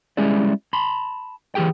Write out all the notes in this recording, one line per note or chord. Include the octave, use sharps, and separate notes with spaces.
G3 G#3 C#4 E4 G#4 D5
A5 B5 C6
E3 F#3 G4 G#4 G5